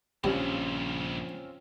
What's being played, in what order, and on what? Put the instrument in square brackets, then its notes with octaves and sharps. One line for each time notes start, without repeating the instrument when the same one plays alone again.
[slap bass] A#1 [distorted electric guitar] G2 C#3 [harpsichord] G3 [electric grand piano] C4 C#4 F4